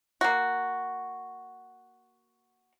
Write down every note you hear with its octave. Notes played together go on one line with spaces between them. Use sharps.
A#3 F#4